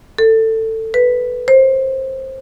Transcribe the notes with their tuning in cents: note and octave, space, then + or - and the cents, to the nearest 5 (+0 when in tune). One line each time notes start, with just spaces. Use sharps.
A4 +20
B4 +0
C5 +20